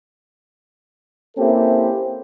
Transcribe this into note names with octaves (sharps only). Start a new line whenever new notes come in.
A#3 C4 C#4 E4 G4 A4